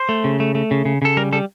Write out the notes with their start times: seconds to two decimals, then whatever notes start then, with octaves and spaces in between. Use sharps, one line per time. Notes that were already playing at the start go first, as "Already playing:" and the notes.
Already playing: C5
0.09 A3
0.24 C#3
0.40 A3
0.55 A3
0.71 C#3
0.85 C#3
1.02 C#3 A4
1.17 G3 A#4
1.32 G3 A4